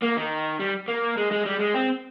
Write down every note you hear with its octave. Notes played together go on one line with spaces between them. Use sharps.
A#3
D#3
G3
A#3
G#3
G#3
G3
G#3
C4